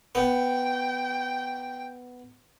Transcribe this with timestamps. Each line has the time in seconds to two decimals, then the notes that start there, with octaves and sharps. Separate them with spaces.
0.15 B3 G5